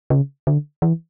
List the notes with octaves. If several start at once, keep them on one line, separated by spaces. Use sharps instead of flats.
C#3
D3
E3